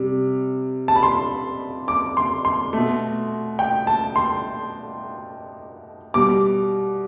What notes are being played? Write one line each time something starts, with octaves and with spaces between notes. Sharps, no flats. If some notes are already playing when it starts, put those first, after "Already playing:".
Already playing: C3 G3
A5
B5
C6
D6
C6
C6
B2 A3
G5
A5
C6
B2 G3 D6